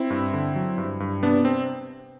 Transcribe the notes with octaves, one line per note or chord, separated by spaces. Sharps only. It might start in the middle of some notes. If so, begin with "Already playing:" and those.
Already playing: C4 E4
G2
D3
F#3
G2
G2
C3 B3 D4
C4